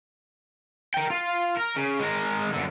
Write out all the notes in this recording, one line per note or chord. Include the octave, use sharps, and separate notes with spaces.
A#4 G5
F4
A#4
C#3
G#3 A#4
F#2 D3